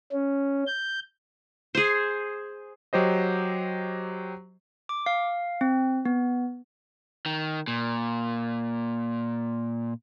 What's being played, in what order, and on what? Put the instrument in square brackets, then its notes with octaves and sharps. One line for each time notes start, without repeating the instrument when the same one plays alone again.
[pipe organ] C#4
G6
[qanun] G#4 C5
[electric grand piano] F#3 G4 C5 D#5
[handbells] D6
F5
C4
B3
[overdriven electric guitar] D#3
A#2